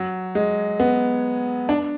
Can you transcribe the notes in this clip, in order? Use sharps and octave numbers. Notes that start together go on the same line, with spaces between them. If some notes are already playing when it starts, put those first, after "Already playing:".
Already playing: F#3
G#3
B3
D4